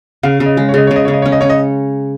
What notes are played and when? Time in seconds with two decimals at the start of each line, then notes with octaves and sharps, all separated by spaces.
0.23 C#3 F5
0.40 C#3
0.46 D#5
0.57 G#3
0.69 C#5
0.74 C#3 D#5
0.87 C#3 C#5
0.96 D#5
1.05 C#3 C#5
1.13 D#5
1.22 C#4 C#5
1.32 D#5
1.41 C#4 C#5
1.50 D#5